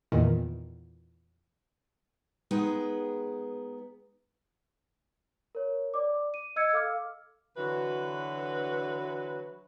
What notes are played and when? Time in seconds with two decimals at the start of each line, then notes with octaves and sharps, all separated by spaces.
0.12 E2 A#2 D#3
2.51 G#3 B3 D#4 G#4 B4 G5
5.55 A#4 C#5
5.94 D5 D6
6.34 D#7
6.56 D#5 E6 G#6 C#7
6.73 A4 F5 D6 F6
7.57 D3 E3 F#3 F#4 B4